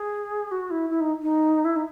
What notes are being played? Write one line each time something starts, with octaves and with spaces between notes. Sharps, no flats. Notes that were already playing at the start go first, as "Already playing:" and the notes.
Already playing: G#4
F#4
E4
E4
D#4
D#4
E4
D#4